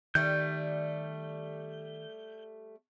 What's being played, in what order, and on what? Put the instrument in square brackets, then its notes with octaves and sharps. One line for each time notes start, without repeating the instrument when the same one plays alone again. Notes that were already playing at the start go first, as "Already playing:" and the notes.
[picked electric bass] D#3 [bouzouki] G3 A3 [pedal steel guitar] G6